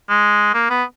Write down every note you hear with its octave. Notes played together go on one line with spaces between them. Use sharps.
G#3
A#3
B3